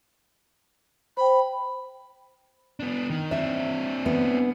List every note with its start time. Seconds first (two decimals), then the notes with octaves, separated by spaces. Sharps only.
1.17 C5 G5 B5
2.80 B3 D4
3.10 D#3
3.31 C4 D4 E5
4.06 B3